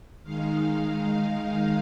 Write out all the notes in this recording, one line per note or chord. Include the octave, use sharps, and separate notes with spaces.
D#3 G#3 D#4 F5
F5